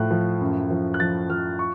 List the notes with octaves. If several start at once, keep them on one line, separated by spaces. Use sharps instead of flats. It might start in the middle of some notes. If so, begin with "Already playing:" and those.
Already playing: A2 F3 F#6
F3
F#2
F3
F#6
F3 A6
F3 F6
C#6